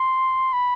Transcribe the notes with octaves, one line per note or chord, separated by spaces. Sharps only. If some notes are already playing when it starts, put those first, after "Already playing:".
Already playing: C6
B5